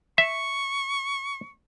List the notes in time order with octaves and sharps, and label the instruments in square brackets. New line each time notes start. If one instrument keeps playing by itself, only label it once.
[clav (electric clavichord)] E5 [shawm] C#6